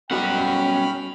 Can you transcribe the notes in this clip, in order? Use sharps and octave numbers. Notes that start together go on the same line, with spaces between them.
B2 F#3 G3 C#4 F#5 G5 B5 F6